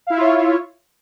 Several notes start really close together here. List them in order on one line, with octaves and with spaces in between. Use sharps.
F5 E4 E5 F4 C#5